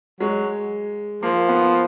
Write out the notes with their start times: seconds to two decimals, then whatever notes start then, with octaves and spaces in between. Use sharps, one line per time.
0.20 F#3 G#3
1.23 F3 A#3
1.49 B3